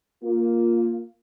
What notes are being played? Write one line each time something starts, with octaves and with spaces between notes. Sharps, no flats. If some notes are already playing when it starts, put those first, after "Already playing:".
A#3 F4